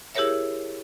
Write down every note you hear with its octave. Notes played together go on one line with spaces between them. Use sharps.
E4 G4 G#4 A#4 C#5 E5